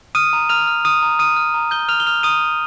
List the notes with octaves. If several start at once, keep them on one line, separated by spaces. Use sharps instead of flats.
D#6 F6 D#7
A#5
A#5 F6 F7
F6
D#6 F6 D#7
A#5
D#6 F6 D#7
F6
A#5
G6 G7
F6 G6 F7
G7
D#6 F6 F7
A#5 D#6 D#7
G6